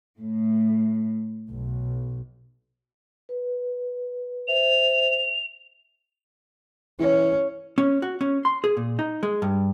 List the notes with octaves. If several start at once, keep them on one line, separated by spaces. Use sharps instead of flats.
A2
B1
B4
C5 E5 F7
E3 C#4
C#4
F#4
C#4
C6
G#4
A#2
D#4
G#3
G2